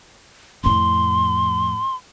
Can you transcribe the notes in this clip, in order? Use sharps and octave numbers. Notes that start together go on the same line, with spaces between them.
F2 A2 C6